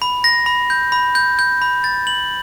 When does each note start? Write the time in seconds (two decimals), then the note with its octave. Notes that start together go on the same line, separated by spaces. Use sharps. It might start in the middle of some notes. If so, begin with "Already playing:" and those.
0.02 B5
0.24 A#6
0.46 B5
0.70 G6
0.92 B5
1.15 G6
1.39 G6
1.62 B5
1.84 A6
2.07 F#7